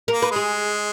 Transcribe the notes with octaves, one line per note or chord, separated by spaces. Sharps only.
A#3 A#4
B4
G#3 G#4